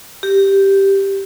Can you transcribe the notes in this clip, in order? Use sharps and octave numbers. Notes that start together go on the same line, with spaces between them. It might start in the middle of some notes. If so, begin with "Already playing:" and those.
G4